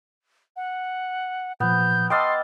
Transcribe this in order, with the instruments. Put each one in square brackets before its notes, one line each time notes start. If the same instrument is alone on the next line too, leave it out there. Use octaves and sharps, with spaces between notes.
[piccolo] F#5
[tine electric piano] A#2 F3 [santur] B3 [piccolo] G6
[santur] D#5 F5 A5 [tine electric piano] G5 D6 E6 [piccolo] C6